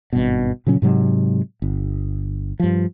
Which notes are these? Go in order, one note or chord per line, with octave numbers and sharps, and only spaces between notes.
G#1 G2 B2
A#2 C#3 F#3 C#4
G#2 C3 F#3 G#3
G1
G2 F3